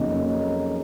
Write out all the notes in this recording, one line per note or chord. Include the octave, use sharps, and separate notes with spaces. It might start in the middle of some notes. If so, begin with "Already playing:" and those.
Already playing: F2 C#3 F#3 A#3 D#4